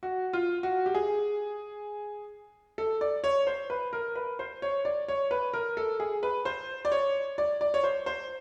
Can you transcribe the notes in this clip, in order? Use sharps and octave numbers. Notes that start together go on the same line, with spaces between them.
F#4
F4
F#4
G4
G#4
A4
D5
C#5
C5
B4
A#4
B4
C5
C#5
D5
C#5
B4
A#4
A4
G#4
B4
C5
D5
C#5
D5
D5
C#5
C5
C5